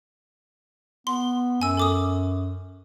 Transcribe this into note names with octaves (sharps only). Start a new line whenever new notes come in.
B3 C6
F#2 G#5 E6
A4 D6 D#6